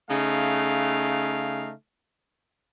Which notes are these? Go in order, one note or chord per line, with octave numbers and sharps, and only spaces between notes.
C#3 A3 D#4 F5